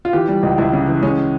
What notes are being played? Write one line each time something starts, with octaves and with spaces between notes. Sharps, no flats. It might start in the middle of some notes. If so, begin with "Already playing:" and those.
F4
E3 G4
G3
C#2
C#2 E4
C#3
E3
G#3 C#4